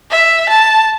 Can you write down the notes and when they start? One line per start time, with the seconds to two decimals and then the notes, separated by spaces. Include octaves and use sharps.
0.11 E5
0.49 A5